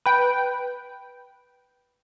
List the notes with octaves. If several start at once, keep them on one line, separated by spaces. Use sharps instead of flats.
B4 G5